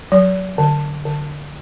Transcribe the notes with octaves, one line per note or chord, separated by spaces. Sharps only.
F#3
D3
D3